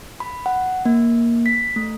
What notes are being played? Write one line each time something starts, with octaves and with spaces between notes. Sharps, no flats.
B5
F#5
A#3
B6
A3